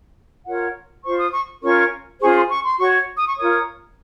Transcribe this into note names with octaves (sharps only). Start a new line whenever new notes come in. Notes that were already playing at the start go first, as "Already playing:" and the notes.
F4 A#4 C#5 F#5
F4 C5 C#6
D#6
C#6
C#4 F4 A#4 C#5 C#6
C#4 F4 G#4 C5 C#6
C6
C#6
C6
F#4 C#5 C#6
D#6
C#6
F4 A#4 C#5 D#6